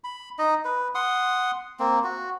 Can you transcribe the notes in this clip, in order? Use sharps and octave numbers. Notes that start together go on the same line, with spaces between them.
B5
D#4 D#5
B4
F#5 C6 D#6
A#3 C4
F#4